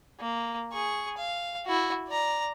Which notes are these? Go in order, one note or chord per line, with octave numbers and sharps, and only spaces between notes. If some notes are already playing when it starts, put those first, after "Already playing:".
A#3
G#4 C#6
F5
E4 F#4
D5 A#5